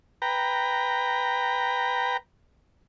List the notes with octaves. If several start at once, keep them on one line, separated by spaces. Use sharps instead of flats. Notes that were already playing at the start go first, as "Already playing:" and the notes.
B4 G5 A#5